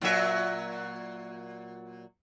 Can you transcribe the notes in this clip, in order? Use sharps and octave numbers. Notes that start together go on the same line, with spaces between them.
A#2 F#3 E5